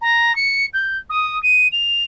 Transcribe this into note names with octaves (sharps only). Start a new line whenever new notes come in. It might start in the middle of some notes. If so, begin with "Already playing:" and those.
A#5
C#7
G6
D#6
D#7
F7